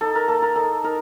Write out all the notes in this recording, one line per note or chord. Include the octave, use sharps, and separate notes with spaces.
D#4 A4
A#4
A#3 A4
A#4
D#4 A4
D#4 A#4